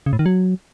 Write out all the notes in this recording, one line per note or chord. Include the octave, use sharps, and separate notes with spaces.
C#3
A2
D#3
F#3